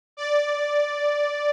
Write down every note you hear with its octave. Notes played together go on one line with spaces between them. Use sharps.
D5